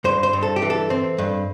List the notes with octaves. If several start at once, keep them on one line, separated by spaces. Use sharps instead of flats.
G2 C5
C5
G2
A4
G4
E3
A4
C4
G2